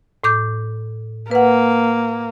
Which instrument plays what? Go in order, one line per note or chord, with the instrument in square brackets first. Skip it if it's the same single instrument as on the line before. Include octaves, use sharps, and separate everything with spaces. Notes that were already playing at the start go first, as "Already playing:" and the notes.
[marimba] A2 D6 G6
[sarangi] A#3 [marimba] B4 F#5